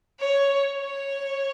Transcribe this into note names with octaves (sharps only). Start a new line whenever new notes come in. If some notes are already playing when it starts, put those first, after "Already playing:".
C#5
C#5